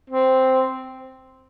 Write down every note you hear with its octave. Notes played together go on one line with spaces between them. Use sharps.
C4